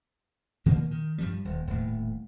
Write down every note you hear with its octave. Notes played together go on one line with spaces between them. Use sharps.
A#2 D#3 F3 A#3
D#3
G2 F3 G3
D#1
D#1 A2